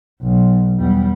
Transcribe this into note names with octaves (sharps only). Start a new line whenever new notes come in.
B1
E2 G3